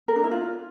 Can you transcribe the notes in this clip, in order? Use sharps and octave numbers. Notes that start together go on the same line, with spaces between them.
A#4
D4
E4
F4